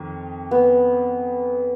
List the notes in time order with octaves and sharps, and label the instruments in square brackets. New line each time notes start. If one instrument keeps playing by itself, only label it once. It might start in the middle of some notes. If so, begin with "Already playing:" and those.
Already playing: [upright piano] F2 D#3
[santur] B3